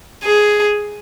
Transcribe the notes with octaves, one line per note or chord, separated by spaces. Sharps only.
G#4